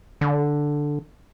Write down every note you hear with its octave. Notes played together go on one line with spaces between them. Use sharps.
D3